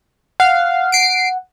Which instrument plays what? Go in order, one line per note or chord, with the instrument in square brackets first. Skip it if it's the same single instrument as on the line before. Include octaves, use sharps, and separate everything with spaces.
[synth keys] F5 [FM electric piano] F#5
[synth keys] C7 D7